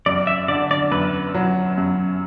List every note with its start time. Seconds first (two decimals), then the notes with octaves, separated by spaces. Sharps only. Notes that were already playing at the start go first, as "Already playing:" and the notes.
0.06 F#2 D5
0.27 E5
0.48 D3 D5
0.71 D5
0.91 F#2 B4
1.35 F#3
1.78 F#2